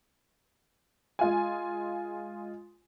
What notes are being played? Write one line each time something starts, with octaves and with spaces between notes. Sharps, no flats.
G#3 F4 G#5